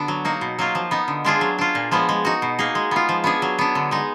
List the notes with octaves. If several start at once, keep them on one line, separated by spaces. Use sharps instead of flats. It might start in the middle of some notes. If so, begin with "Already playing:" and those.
Already playing: D3 B3 D4 F#4
F#3
A#3 D#4 F#4
B2
F#3 A#3 F4
F3
B3 D#4
D3
G#3 D4 F4 G#4
F#3
D4 F4
A#2
F3 G#3 B3
G#3
D#4 F#4
B2
A#3 D#4 G#4
G#3
B3 F4
F3
B3 D4 G#4
F#3
B3 D4
D3
G#3 D#4